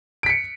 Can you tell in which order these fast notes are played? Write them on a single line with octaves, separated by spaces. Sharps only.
D7 B6 C#7